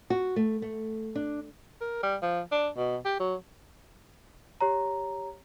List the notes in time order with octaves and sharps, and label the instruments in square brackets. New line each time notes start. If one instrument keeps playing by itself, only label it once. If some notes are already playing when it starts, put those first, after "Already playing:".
[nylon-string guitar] F#4
A3
A3
D4
[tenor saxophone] A#4
G3
F3
D4
B2
G4
F#3
[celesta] G4 C#5 A#5